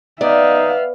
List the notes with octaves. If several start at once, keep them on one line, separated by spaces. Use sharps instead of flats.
B3 D#4 D5 E5 F5